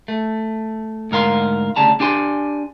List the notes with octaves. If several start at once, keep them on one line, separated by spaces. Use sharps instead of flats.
A3
D2 G#2 A#4 F5 C6
D2 C#3 G3 A5 A#5
D4 G4 G#5 C6